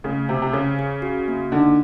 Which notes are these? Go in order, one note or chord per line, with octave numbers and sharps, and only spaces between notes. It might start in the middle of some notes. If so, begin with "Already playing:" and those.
C#3 A3
C3 C5
C3
C#3 C#5
G#4
F#4
A#3
D3 D#4